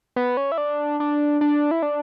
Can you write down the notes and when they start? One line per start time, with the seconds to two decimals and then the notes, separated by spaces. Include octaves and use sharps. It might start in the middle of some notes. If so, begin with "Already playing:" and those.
0.16 B3
0.37 C#4
0.52 E4
0.58 D4
1.00 D4
1.41 D4
1.71 E4
1.82 D4